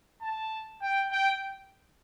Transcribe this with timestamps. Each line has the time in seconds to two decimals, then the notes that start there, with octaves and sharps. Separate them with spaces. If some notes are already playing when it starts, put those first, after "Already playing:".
0.22 A5
0.82 G5
1.11 G5